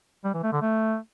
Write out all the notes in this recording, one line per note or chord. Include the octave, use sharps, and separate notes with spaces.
G3
E3
A3
D3
A3